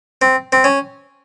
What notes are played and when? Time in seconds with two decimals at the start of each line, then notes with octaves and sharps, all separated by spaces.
0.22 C4
0.52 C4
0.64 C#4